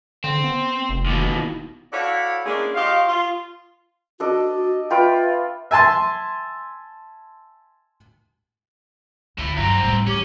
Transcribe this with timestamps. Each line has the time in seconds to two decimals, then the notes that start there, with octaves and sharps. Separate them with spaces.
0.24 D3 C4
0.44 B3
0.89 F1
1.06 D#2 B2
1.37 E4
1.93 E4 F#4 A4 C#5 D5 F5
2.46 G#3 A#3 C#4 D4 E4 G#4
2.75 F4 G4 C#5 D#5 F5
3.08 F4
4.20 D4 F#4 A4 D#5
4.90 F4 B4 E5 G5
5.71 E5 G#5 A5 C6
9.38 D2 A2 E4
9.57 E2 G2 F#3 C4 A#5
9.83 A2 G3
10.07 E3 C#4 G4